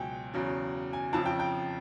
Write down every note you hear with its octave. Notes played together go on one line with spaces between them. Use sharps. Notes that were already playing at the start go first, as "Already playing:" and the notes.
Already playing: C#2 B2 F#3 G5 G#5
E2 C#3 F#3
G#5
F2 C#3 F3 A5
G5
G5